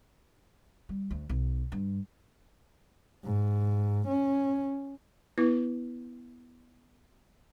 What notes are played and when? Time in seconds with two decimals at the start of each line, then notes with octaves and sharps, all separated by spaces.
0.89 G3
1.10 D2
1.29 B1
1.72 G2
3.24 G#2
4.08 C#4
5.38 B3 E4 B4 D6